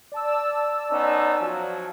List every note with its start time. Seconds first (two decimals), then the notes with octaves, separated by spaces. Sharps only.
0.12 D5 A5 E6
0.91 B3 C#4 D#4
1.41 F3 F#3